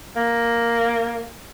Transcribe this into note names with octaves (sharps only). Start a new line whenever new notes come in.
A#3